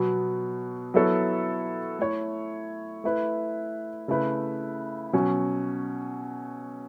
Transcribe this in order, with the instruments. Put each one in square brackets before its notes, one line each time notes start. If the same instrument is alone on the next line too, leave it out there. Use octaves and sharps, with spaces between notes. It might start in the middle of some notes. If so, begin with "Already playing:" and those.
Already playing: [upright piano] B2 F#3 B3
F#3 B3 E4 A4 C#5
A3 E4 C#5
A3 E4 B4
C#3 A3 E4 B4
B2 F#3 C#4